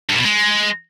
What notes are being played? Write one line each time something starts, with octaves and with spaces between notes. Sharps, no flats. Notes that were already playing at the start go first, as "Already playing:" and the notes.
G2
A#2
B2
G#3